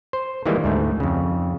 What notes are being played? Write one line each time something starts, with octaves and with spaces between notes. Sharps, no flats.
C5
D#3 E3 G3 G#3 A#3
D2 G#2 A3
F2 C#3